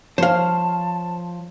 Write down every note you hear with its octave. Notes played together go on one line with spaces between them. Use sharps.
F3 C5 C#5 F5 A5